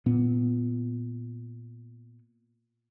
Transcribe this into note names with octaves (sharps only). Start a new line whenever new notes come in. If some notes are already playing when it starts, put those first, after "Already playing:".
A#2 B3